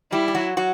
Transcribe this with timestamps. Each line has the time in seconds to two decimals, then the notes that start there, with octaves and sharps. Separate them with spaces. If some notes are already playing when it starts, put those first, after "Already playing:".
0.12 G3 E4 G4
0.28 G4
0.35 F#3 F#4
0.57 F#3 F#4